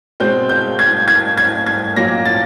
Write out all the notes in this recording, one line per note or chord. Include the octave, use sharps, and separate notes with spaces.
B2 G#3 C4 G6
G6
G#6
G#6
G#6
G#6
A#2 F#3 A#3 A#6
A6